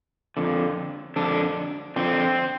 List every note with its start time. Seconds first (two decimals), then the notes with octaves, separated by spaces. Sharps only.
0.37 F2 D3
1.16 F2 D3 D4
1.96 F2 D3 C4